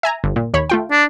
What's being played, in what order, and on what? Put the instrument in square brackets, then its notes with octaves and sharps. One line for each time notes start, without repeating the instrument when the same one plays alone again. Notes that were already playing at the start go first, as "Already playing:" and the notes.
[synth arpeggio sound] E5 G#5 A#5
G1
A#2
D#2 C#5 B5
A3 F4 G5
[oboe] D4